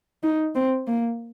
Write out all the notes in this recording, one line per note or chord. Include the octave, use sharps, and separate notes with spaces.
D#4
C4
A#3